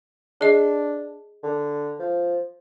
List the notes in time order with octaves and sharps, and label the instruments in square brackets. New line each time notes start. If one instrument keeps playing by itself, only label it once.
[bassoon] D4 [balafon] G#4 D#5
[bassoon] D3
F3